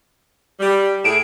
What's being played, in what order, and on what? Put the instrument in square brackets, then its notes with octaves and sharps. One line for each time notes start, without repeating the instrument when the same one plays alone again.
[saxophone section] G3
[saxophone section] A2 G#4 [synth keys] D7 E7